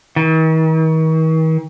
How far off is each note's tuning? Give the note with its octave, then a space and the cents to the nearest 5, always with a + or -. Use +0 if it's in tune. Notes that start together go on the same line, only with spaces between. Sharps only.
D#3 +45